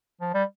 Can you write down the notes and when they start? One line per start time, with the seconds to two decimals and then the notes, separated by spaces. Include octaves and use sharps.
0.21 F3
0.34 G3